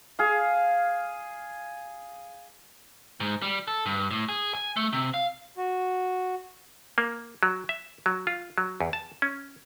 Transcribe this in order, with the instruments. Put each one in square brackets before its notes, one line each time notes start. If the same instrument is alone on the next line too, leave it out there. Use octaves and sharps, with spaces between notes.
[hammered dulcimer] G#4 F5
[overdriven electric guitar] G#2
G3
A4
G2
A2
G#4
G#5
A3
C3
F5
[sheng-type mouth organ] F#4
[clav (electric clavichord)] A#3
F#3
E5
F#3
F4
F#3
E2
A5
C#4